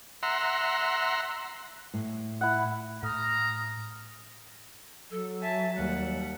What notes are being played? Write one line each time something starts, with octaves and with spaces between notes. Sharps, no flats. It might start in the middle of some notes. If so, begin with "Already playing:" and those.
E5 F#5 A#5 C6
A2
E4 F#5
A2 A#5 D#6 F6
F#3 A4
E5 G#5 A5
D#2 G3 F#5